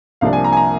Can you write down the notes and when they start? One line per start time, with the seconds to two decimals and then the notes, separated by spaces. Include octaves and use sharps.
0.21 C2 C3 F3 A#3 D4 F5
0.33 G#5
0.44 A#5
0.53 G#5
0.57 A#5